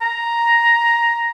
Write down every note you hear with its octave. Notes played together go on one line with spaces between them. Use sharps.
A#5